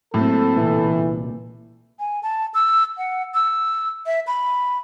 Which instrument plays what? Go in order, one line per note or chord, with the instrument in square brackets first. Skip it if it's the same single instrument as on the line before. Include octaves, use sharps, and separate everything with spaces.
[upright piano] A2 [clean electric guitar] F#3 A#3 C4 [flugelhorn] A4
[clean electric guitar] C2 A#2 [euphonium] E3
[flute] G#5
A5
E6
F#5
E6
E5
B5